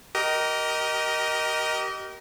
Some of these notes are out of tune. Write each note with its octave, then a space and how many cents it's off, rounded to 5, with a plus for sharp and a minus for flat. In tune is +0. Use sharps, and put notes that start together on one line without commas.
G4 -30 A#4 +10 D#5 +0